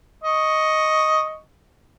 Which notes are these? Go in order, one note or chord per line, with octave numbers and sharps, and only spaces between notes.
D#5 C#6